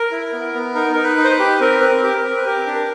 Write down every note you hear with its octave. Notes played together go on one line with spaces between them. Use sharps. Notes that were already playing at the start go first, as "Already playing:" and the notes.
Already playing: A#4
E4
B3
B3
D#4 A#4
D#4 A#4
B4
D#4
C5
B4
G4
C4 A#4
C4 B4
A#4
G4
A#4
C4
B4
G4 A#4
D4
A#4